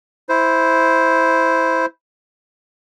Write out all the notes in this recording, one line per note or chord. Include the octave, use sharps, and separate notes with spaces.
E4 C5